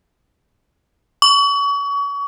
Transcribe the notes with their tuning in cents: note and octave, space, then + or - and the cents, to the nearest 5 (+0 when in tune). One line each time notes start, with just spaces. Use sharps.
C#6 +35